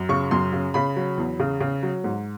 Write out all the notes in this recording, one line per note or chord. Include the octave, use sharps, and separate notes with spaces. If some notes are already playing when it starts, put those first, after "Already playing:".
Already playing: F#2
C#3 C#6
F#2 C6
C#3
C#3 B5
F#3
E2
C#3
C#3
F#3
G#2